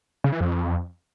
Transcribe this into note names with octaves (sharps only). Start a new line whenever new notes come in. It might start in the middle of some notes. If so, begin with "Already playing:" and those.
C#3
E3
F2